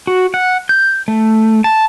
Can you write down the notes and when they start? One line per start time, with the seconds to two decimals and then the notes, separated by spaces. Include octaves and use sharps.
0.07 F#4
0.34 F#5
0.69 G6
1.08 A3
1.64 A5